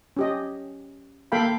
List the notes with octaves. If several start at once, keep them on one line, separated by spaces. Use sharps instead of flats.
C#4 G4 D#5
A#3 A4 F5 G5 B5